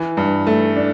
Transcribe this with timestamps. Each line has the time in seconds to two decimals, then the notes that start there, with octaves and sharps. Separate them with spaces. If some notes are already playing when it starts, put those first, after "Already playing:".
Already playing: E3
0.17 G2
0.47 A3
0.76 D4